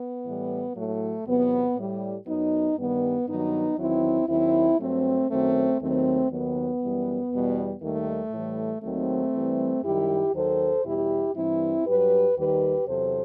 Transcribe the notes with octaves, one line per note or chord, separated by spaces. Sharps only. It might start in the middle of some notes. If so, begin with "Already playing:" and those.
Already playing: B3
A2 E3 G3
A2 F#3 A3
E2 C3 F#3 B3
A2 G3
F#2 F#3 B3 D#4
G2 D#3 G3 B3
G2 D#3 F#3 B3 D#4
E2 D#3 F#3 C4 E4
D#2 D#3 F#3 C4 E4
G2 F#3 A3 C4
F#2 D#3 F#3 A3 C4
D#2 D#3 F#3 A3 C4
D#2 D#3 F#3 B3
F#2 E3 G3
E2 B2 G3
D#2 D#3 G3 A3
A2 E3 G3
D#2 D#3 F#3 A3 C4
G2 E3 G3
F#2 D#3 G3 E4 G4
D#2 D#3 F#3 A4 C5
E2 B2 G3 E4 G4
G2 E3 G3 C4 E4
G2 F#3 G4 B4
D#2 D#3 G3 G4 B4
E2 C3 F#3 A4 C5